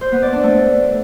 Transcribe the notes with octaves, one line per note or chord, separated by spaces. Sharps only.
C5
B3
D5
D4
A3